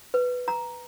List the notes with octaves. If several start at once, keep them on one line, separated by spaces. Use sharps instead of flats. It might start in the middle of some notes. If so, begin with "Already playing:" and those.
B4
A#5